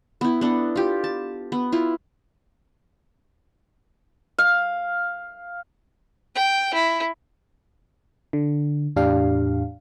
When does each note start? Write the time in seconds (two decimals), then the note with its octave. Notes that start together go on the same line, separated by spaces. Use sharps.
0.21 B3 E4
0.41 B3 D4 A4
0.76 F4 G4
1.04 A5
1.52 B3
1.72 E4 F4
4.38 F5
6.35 G5
6.74 E4
8.33 D3
8.96 E2 A2 D4 G4 F5